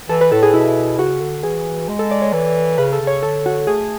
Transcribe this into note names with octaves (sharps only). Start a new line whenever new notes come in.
E3 A4
B4
A2 A4
G#4
B2 E4
C#3 F#4
D3
E3 G#4
G#3
A4
D5
C#5
E3
C#3 B4
A4
C#3
C#5
D3 A4
F#4
A3 G#4